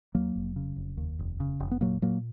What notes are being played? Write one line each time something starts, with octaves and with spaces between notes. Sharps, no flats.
D#2 F#3 A#3
F1
C#3
F1
D#2
F1
C#3
F1
B3
A#2 F#3 A#3
A#2 F#3 A#3